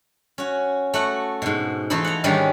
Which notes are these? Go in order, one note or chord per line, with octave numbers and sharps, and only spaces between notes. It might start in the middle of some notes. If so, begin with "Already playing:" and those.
C#4 F#4
A3 F#4 F#5
G#2 B2
E3 F3 A3 D#4 E4
F#5 A#5
G#2 D#3 G3 C#4 D4 G4